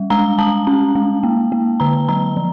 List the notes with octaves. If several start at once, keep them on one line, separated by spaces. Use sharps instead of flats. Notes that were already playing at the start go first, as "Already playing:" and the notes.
Already playing: G3
G#3 A#5
G#3 A5
C#4
G#3
A#3
A#3
D3 A#5
F#3 A#5
F3